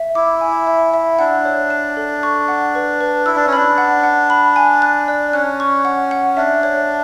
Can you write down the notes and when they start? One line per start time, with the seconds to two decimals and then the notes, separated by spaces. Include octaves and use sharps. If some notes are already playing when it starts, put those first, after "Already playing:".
Already playing: E5
0.15 E4 D6
0.41 G#5
0.67 E5
0.94 E5
1.19 D4 F#5
1.45 C#5
1.70 A5
1.97 A4
2.23 C#6
2.48 F#5
2.75 B4
3.01 B4
3.26 E4 E6
3.36 D4
3.47 C#4
3.53 D4 B5
3.78 F#5
4.03 F#5
4.30 B5
4.56 G#5
4.82 F#6
5.08 D5
5.33 C#4 F#6
5.60 C#6
5.85 F#5
6.11 F#5
6.37 D4 E5
6.63 C#5